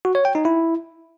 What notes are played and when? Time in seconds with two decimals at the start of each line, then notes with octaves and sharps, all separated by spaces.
0.05 F#4
0.15 C#5
0.25 G5
0.35 D#4
0.45 E4